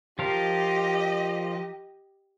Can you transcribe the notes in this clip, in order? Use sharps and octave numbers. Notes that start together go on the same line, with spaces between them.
F3 F4 G4 A#4 D#5